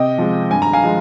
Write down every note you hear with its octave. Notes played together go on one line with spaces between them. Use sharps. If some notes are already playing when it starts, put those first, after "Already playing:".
Already playing: C3 D#5 G5
F3 G#3
G2 G#5
A#5
F5 G#5
F3 G#3